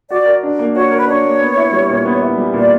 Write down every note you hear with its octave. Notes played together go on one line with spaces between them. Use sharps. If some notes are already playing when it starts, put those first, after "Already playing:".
F#4 D5
A#4
D4
A#3
F#4 C#5
A#4
B4
D4 C#5
A#3
B3
E4
G3
A#2
B3
E4
G3
A#2
D5